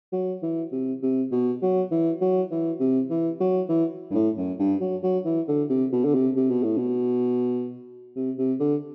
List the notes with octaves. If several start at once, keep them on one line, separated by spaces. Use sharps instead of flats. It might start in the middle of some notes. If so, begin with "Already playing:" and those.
F#3
E3
C3
C3
B2
F#3
E3
F#3
E3
C3
E3
F#3
E3
G2
A2
F#2
G2
F#3
F#3
E3
D3
C3
B2
D3
C3
C3
B2
A2
B2
C3
C3
D3